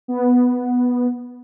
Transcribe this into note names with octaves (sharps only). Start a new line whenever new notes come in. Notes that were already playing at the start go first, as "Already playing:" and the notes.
B3